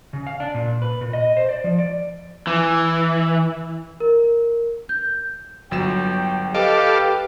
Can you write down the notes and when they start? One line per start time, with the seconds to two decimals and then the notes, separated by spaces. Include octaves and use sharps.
0.13 C#3
0.27 F5
0.40 D4
0.54 A#2
0.82 B4
1.01 A#2
1.13 D#5
1.37 C5
1.49 D5
1.64 F3
1.78 D5
2.47 E3
4.00 A#4
4.89 G6
5.71 G1 F#3 G5 E7
6.54 G4 A4 B4 D#5 F5 D6